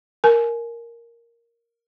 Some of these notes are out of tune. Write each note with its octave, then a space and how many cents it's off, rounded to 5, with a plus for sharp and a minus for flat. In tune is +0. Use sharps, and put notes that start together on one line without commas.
A#4 +0 G#5 +25